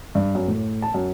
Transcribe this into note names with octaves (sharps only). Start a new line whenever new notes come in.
G2
F#2
A2
A5
F#2